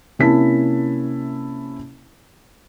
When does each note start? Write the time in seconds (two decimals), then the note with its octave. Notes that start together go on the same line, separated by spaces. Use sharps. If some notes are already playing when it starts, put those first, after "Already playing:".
0.19 C3 A#3 C#4 E4 A5 B6